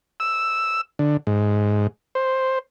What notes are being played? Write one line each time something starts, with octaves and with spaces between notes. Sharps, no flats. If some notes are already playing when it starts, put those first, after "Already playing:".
E6
D3
G#2
C5